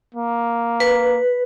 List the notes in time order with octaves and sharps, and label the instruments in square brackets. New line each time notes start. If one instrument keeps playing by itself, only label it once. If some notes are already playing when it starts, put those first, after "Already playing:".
[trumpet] A#3
[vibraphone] B4